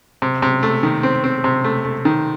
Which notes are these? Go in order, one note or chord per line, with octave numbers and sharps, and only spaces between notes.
C3
C3
A3
D#3
C4
C4
C3
A3
A3
D#3